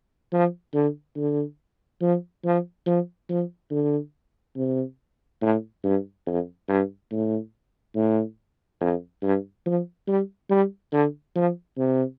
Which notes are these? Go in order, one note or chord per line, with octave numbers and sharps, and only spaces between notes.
F3
D3
D3
F3
F3
F3
F3
D3
C3
A2
G2
F2
G2
A2
A2
F2
G2
F3
G3
G3
D3
F3
C3